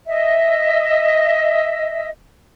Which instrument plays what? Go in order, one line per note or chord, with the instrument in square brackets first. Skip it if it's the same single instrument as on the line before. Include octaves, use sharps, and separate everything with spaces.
[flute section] D#5 E5